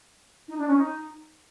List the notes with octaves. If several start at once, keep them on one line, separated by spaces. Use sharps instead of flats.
D#4
D4
C#4
D#4